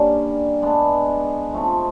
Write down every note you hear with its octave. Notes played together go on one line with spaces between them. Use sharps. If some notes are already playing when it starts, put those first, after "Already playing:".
Already playing: D3 G3 A#3 C#4
G#3 B3 D4
F3 A3 C4 D#4